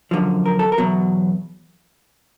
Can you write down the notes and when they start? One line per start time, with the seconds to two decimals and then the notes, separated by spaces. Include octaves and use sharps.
0.11 F#2 D3 F3
0.46 A#4
0.59 A4
0.72 A#4
0.78 E2 B2 F#3